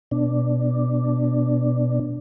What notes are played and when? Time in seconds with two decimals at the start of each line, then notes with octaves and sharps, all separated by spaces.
0.11 B2 D4